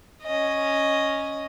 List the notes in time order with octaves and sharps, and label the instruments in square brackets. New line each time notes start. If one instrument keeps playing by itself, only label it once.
[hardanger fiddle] C#4 D#5